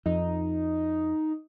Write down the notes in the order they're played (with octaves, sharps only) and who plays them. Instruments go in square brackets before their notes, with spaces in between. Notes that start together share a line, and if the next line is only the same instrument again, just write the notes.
[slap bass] F2 [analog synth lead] D#4